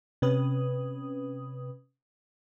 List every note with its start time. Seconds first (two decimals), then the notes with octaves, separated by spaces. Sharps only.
0.22 C3 C#4 B4 D#6